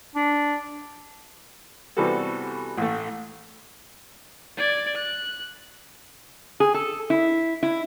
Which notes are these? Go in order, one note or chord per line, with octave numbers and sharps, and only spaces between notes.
D4
C3 E3 G3 B3 F#4 A4
A1 A3
D5 G#6
F#6
G#4
A4
E4
E4